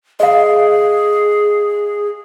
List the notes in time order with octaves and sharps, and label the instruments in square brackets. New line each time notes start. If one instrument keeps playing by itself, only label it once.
[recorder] G#4 [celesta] D#5 F5